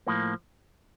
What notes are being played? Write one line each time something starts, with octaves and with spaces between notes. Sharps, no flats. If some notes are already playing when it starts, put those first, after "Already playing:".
A2 F3 A#3